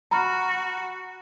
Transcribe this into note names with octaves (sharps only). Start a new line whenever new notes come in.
F#4 A#5 B5 F6